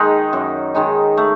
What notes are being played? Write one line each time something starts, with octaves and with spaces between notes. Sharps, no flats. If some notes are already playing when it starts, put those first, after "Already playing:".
Already playing: D#3 G#3 D#4
F#2
D#3 G#3 D#4
A3